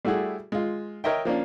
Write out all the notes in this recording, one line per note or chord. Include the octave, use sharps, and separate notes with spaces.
G3 A3 E4 F#4 G#4
G#3 F4
A#4 C#5 D#5 E5 G5
F3 A#3 C#4 D4